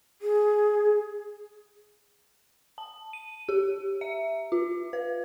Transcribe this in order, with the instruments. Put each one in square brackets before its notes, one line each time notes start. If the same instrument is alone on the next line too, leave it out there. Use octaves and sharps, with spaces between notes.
[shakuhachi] G#4
[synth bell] A5
D#7
G4
E5
F4
B4